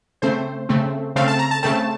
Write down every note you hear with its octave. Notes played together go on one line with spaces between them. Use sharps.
C#3 A3 C4 C5
C#3 A3 C4
C#3 A3 C4 F5
A5
A#5
A5
C#3 A3 C4 A5